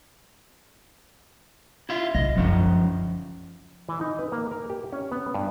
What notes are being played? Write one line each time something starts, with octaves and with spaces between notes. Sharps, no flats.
E4 F4 E5
B1 A2 D#5
F#2 D3 F3 C#4 D#4
E3
D#4
B4
A#3
A#4
G4
C#4
B3
G2